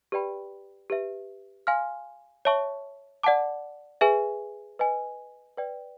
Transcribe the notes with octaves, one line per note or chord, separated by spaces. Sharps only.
G4 B4 D5 G5 B5
G4 B4 E5
F5 G#5 C6 F6
C#5 E5 A5 C#6
D5 F#5 A5 D6
G#4 B4 E5 G#5
B4 D#5 G#5
B4 D5 G5